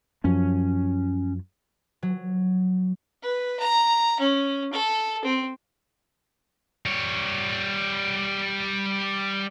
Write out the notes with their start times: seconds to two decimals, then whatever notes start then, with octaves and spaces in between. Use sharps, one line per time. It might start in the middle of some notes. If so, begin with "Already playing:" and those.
0.24 F#2 F3 C#4
2.02 F#3
3.22 B4
3.59 A#5
4.19 C#4
4.72 A4
5.24 C4
6.86 G3 C#5